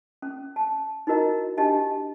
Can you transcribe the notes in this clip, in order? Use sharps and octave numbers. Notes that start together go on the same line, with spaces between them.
C#4
A5
D#4 E4 F#4 A#4 D#5 A#5
D4 G4 D#5 A5